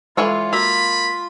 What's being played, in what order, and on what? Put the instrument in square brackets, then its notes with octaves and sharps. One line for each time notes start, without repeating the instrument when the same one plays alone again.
[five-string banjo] E3 C#5 F5 [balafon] G#3 A4 [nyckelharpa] F4
[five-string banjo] A#3 [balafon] F#4 [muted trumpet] B5